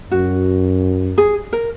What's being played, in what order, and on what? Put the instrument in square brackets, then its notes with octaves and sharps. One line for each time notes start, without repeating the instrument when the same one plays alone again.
[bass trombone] F#2 [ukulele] F#4
[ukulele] G#4
A#4